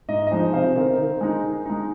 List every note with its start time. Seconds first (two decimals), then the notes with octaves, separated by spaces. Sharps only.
0.09 G#2 D#5
0.27 D#5
0.31 F3 G#3 D#4 C5
0.53 C3 C5 F5
0.76 D#3 C4 D#4
0.98 D#3
1.21 G#3 D#4
1.44 D#3
1.65 G#3 D#4